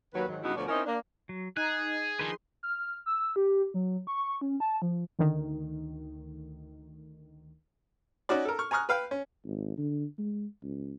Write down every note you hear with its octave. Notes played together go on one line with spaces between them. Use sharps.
D#2 F#3 B4
G#2 D#3 F#3
G2 C#3 B3 D#4 E4 F#4
D2 B2 F3 C#5 D5
C4 C#4 D#4 E4 A#4 D#5
A#3 D4
F#3
D#4 G#4 G#5 F#6
D#3 F3 D4 D#4 G#4 B4 C6
F6
E6
G4
F#3
C#6
C#4
A5
F3
D2 D#3
C#4 D#4 F#4 D5
A4 A#4
C#6 F6
G#5 A#5 C#6 D#6 F6 F#6
B4 F5 G5
C#4
G#1
D3
G#3
C#2